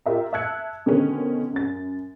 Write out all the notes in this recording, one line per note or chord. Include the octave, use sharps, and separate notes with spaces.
F4 G4 A#4 E5 A#5
E5 A5 E6 F#6 G#6 C#7
B2 D3 D#3 G#3 C4 C#4
F#2 A6